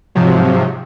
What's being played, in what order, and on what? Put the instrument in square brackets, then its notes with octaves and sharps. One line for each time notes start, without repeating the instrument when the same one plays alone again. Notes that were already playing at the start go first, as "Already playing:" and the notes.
[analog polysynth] G#2 C3 F3 F#3